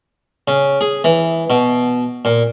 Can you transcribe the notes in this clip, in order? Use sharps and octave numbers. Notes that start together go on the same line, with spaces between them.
C#3
G#4
E3
B2
A#2